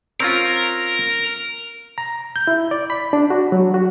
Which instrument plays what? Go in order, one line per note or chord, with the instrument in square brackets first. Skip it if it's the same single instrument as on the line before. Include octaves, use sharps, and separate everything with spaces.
[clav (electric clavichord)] C4 C#4 F4 [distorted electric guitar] A#4
[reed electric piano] A#5
G6
E4
D5
B5
D4
F#4
F#3
F#4